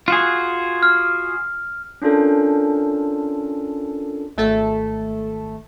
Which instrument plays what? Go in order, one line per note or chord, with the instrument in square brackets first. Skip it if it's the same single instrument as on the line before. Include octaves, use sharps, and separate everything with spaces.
[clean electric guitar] F4 F#4 G#4
[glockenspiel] F6
[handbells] C#4 D4 F4 A4 A#4
[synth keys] G#1 A3 A4